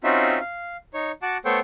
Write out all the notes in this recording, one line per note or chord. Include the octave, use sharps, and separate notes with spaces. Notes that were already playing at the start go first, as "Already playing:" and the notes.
C4 C#4 D#4 F4 F#4 E5
F5
D#4 C#5
F#4 F#5 A5 D6
A3 B3 A4 C5 C#5 G5